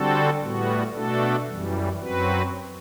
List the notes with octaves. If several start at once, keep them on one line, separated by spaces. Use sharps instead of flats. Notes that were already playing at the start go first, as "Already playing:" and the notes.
Already playing: D3 G3 C4 F#4 A4
A2 G3 B3 F#4
B2 A3 D4 F#4 A4
F#2 E3 G3
F#2 F#3 C4 F#4 B4